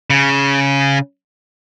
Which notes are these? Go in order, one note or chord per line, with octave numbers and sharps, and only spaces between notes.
C#3